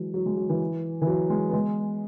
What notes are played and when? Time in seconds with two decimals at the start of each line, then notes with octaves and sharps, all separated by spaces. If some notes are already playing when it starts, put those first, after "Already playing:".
Already playing: E3 F#3 G#3
0.14 F#3
0.26 G#3
0.37 F#3
0.50 E3
1.02 E3
1.07 F#3
1.30 G#3
1.49 B3
1.53 G#3